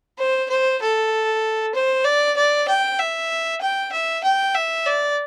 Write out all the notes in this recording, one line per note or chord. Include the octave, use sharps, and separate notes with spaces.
C5
C5
A4
C5
D5
D5
G5
E5
G5
E5
G5
E5
D5